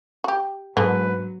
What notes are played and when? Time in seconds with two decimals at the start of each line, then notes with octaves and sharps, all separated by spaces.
0.24 F#4 G4
0.77 G#2 D3 F#3 A#3 B3 B4